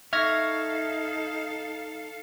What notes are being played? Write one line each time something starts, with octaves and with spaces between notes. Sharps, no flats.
D#4 A4 E5 F5 C#6 F6 G#6 A#6